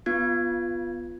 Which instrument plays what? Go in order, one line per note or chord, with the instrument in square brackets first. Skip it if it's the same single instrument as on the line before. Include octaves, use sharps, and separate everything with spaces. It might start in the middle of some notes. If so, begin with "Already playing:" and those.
[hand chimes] B3 F4 G#6